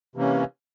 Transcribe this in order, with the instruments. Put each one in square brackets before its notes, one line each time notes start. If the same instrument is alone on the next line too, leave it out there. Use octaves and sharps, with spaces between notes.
[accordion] C3 E3 A#3 C#4